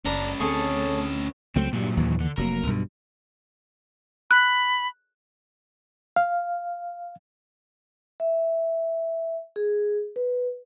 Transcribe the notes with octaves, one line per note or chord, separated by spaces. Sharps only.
F#1 C#3 C#4 D4 B4 A#5
D2 C4 G#4 A4 C#5
C#2 F#3 A3 C4
G2 A#2 F#3
D#2 E3
D3
F1 F#3 A#3 A#4
B1 G2 B2
B5 F#6
F5
E5
G#4
B4